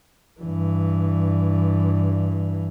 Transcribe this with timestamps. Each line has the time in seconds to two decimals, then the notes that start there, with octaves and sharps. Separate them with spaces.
0.40 G2 E3